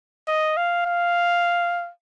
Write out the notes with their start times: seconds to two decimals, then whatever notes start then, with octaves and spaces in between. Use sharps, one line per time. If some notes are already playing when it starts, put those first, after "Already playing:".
0.27 D#5
0.57 F5
0.86 F5